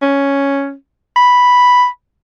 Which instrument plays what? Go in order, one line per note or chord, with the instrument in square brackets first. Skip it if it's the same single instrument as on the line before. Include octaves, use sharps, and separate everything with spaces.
[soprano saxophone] C#4
B5